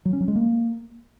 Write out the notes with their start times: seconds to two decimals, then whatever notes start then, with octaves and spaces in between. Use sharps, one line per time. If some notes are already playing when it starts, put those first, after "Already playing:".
0.05 F#3
0.13 C#4
0.20 F#3
0.28 G#3
0.35 A#3